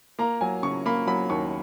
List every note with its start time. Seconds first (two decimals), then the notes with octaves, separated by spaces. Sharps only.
0.19 A#3 A#5
0.41 F#3 G#5
0.63 C#3 C#6
0.86 A#3 B5
1.07 F#3 B5
1.30 D#2 C#6